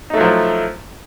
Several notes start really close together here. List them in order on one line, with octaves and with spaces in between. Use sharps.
D#4 A3 F#3 F3 E4